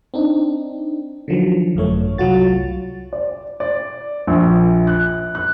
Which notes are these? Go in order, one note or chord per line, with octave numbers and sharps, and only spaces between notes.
C4 D4 D#4
D3 D#3 F3 F#3
G#1 F#2 A3 C#5
C2 F#3 F4 F#4 A6
D5
D5
A#1
F#6
F#6